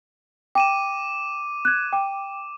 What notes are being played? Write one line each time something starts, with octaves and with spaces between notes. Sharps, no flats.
G5 D6 D#7 E7
F#6 G#6
G5 D6